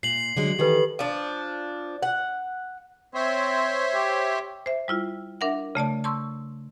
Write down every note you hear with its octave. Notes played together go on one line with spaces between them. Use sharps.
A#2 C7 F#7
D3 F#3 G#3
D#3 E3 G4 A4 B4
F3 D4
F#5
C4 C5 C#5 E5
G4
C5 E5
G3 E4 F4
D4 A#4 E5 F#5
C#3 A3 D5 A5
A5 C6 C#6 E6